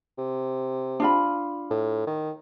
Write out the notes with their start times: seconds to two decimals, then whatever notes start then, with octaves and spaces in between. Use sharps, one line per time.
0.18 C3
1.00 D4 F4 B5
1.70 A2
2.07 D#3